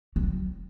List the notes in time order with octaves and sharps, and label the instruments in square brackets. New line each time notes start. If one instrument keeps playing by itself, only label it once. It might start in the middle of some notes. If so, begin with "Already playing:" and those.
[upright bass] F#3